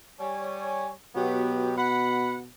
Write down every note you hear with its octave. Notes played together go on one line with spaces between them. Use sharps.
G3 C#5 G#5
B2 F#3 B3 G4
F#5 B5